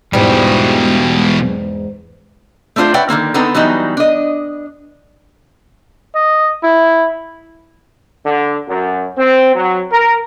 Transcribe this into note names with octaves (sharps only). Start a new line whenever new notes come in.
E2 G#2 B2 E3 G3
A3 C4 D4 F4 C5
B4 C#5 D5 E5 F#5 G5
D3 D#3 A#3 C4
D3 B3 C4 D#4 A4 A#5
E3 F#3 G3 B3 D#4
D4 D#5
D#5
E4
D3
F#2
C4
F#3
A#4